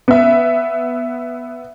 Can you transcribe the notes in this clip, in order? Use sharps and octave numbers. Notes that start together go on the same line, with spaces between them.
B3 E5